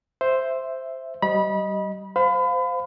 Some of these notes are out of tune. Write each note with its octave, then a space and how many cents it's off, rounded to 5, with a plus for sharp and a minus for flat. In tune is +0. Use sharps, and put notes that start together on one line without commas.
C5 +0 E5 +0
G3 -35 D#5 +0 B5 -25
C5 -15 F5 +15 B5 +35